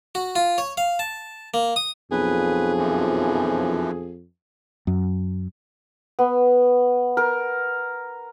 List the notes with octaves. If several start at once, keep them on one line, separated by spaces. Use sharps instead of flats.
F#4
F4
C#5
F5
A5
A#3
D#6
B1 F2 G#4 B4
F#2 E3 F3
F#2
B3
A#4